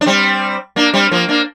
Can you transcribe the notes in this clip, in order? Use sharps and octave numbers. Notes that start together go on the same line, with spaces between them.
D4
G3 C4
A#3 D4
G3 C4
F3 A#3
A#3 D4